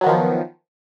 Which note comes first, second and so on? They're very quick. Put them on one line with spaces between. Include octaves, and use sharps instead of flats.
F#3 B3 D#3 F3